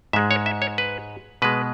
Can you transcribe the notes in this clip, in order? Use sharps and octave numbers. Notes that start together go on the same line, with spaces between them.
G#2 G#3 E5
C#5
E5
C#5
B4
B2 G#3 B4